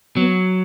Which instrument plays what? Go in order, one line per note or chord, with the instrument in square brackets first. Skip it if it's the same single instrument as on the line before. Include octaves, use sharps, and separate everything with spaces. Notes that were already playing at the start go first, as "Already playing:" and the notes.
[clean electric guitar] F#3 [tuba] B3